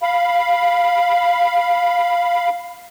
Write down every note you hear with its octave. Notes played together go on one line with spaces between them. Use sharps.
F5 B5